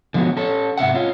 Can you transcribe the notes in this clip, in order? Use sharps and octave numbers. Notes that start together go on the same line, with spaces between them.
D3 F3 G#3 B3 C#4 F#4
C#4 A4
G#2 C3 E5 F#5
C#4 F4